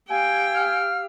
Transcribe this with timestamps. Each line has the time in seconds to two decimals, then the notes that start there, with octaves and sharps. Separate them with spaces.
0.10 G4 F5 G5 G#5 E6
0.54 F6